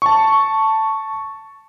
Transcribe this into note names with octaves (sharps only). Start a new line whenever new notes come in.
A5 C#6